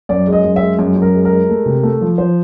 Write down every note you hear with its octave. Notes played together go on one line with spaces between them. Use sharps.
F#2 D5
G#3
D#5
F#2
E5
G#3
F#2
F#2
A#4
G#3
A#4
G#3
A3
C3
A3
F3
F3 C5